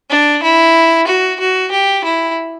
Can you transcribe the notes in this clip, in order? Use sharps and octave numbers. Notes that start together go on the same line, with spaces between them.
D4
E4
F#4
F#4
G4
E4